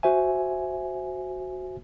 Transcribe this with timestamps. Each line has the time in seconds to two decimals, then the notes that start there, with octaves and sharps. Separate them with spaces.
0.03 F#4 C5 E5 G#5